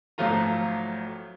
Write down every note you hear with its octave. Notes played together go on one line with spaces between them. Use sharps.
G#1 F3 F#3 A3 F4 A#5